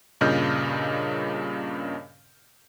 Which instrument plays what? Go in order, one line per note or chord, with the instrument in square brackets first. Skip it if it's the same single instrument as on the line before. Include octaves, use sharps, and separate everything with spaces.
[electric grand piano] G2 A#2 C#3 D#5 F6 G6